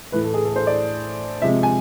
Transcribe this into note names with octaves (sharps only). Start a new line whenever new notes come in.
A2 E3 A3 B4
A4
G#4
A4
C5
D5
C3 F3 G#3 E5
G#5